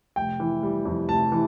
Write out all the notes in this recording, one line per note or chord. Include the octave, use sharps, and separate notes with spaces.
F1 G5
E3
G3
F2
F1 A5
E3